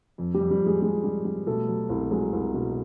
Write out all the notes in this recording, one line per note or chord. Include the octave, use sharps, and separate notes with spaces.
F2
G3 G4
F2
G3 G4
F2
G#3 G#4
G3 G#3 G#4
G3
G3
B2 A3 A4
F#3
C2
F#3 G#3 G#4
C2
B2